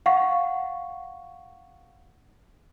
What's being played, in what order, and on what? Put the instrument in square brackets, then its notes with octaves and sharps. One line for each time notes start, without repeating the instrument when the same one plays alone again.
[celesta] F5 F#5 C#6